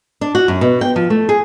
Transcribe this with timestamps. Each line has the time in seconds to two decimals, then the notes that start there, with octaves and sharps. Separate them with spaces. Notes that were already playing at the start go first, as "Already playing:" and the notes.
0.21 D4
0.35 F#4
0.48 F#2
0.61 B2
0.81 G5
0.96 F3
1.10 A3
1.29 G#4